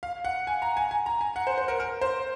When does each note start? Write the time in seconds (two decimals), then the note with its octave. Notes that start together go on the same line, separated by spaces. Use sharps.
0.03 F5
0.25 F#5
0.47 G#5
0.62 A#5
0.77 G#5
0.91 G#5
1.06 A#5
1.21 G#5
1.36 F#5
1.47 C5
1.58 C5
1.68 A#4
1.80 A#4
2.01 C5